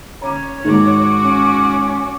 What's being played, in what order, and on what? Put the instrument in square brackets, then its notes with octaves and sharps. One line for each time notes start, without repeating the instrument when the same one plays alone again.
[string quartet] C#4 [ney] C#5 [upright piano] A#5 D6 D#7
[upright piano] G#2 D#3 [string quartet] F#4 D6
[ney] C#4